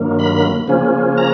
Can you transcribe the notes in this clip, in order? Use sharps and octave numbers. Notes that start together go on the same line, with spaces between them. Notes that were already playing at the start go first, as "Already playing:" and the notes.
Already playing: G2 D#3 F#3 A#3
B5
C#3 F3 A#3 C#4
A#5